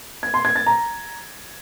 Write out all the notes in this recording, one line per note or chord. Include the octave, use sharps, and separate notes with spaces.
G#6
C6
G#6
A6
A#5